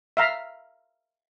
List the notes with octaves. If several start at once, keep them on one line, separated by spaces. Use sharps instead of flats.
E5 F5 A#5